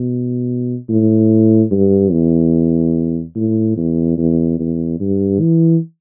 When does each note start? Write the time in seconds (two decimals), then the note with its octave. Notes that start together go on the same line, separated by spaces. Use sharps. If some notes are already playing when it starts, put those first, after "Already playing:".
Already playing: B2
0.90 A2
1.72 G2
2.12 E2
3.36 A2
3.77 E2
4.18 E2
4.59 E2
5.00 G2
5.40 E3